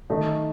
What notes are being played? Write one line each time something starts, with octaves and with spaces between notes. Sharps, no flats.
D#3 A3 D#4